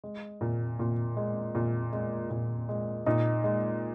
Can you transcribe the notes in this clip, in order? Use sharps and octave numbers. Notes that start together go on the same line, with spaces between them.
G#3
A#2
A#2
G#3
A#2
G#3
A#2
G#3
A#2 D#4
G#3